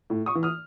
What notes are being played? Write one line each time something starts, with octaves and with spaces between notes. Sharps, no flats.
A2
C#6 D#6
E3
D#6 F6